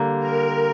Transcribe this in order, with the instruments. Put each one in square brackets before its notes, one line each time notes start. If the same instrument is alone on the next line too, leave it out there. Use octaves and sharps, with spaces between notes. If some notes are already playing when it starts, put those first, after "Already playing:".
Already playing: [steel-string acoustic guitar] D3 G3 A#3
[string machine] A#4